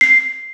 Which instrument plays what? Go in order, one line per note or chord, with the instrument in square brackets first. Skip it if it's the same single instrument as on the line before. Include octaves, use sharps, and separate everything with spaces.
[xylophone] C7